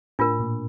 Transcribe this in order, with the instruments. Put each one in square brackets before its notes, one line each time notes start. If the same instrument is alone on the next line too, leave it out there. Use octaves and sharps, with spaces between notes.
[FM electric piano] A2 [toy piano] D4 F4 A#4
[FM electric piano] A#2